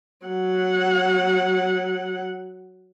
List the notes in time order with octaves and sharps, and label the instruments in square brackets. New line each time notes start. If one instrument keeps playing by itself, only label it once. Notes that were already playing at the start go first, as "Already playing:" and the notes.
[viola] F#3 F#5